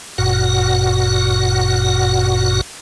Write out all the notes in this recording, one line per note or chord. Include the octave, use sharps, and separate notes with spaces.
G1 F#2 A#2 F#4 F#5